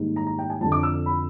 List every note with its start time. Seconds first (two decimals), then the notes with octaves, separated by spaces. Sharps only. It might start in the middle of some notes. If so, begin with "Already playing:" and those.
Already playing: G#2 D#3 G3 A#3
0.16 A#5
0.27 A#5
0.39 G5
0.50 G#5
0.61 F2 D3 F3 A5
0.72 D6
0.83 E6
1.06 B5